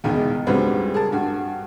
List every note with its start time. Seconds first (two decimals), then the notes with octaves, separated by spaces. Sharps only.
0.04 E2 B2 D#3 G#3
0.47 C#2 G2 F#3 G3 B3 C4
0.94 G#4 A#4 A5
1.12 G2 F#4